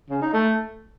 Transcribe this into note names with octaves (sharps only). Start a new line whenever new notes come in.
C#3
D#4
A3